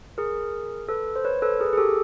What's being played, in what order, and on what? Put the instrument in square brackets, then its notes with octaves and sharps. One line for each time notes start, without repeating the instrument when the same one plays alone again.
[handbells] G#4 A#4
A4 B4
C5
B4 C#5
A4 B4
G#4 A#4
G#4
G4 A4